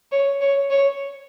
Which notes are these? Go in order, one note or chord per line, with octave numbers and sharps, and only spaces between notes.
C#5
C#5
C#5